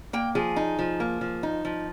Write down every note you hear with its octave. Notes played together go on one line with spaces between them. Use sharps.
A#3 G5
F3 G#4
D#4
F3
A#3
F3
D#4
F3